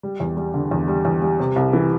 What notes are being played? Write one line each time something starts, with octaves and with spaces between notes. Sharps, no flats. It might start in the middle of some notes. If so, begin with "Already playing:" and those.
G3
E2
G3
D3
E2
G3
E2
G3
C3
C2
E3